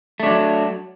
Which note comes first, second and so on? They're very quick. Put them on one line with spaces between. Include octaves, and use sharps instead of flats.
A3 D4 F#3